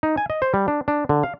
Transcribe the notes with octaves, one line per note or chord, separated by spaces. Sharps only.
D#4
G#5
D#5
C5
G3
D4
D4
D3
F5